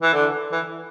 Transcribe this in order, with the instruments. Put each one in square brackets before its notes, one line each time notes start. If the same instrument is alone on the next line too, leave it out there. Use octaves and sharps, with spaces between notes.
[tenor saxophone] E3
D3
E3